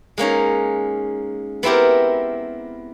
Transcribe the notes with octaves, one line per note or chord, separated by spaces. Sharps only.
G#3 A#3 C#4 D#4
B3 C4 E4 G4 A#4